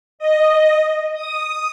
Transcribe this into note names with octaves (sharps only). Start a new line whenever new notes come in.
D#5
D#6